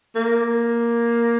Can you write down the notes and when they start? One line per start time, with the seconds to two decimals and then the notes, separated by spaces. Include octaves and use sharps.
0.16 A#3